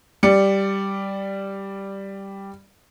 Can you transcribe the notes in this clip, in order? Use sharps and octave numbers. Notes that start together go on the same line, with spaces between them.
G3 D5 C#7